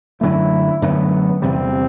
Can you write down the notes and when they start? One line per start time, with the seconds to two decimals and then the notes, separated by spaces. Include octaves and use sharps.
0.21 F#2 D3 F#3 A3 E4
0.82 F#2 D3 F#3 A3 B3
1.42 E2 C3 G3 C4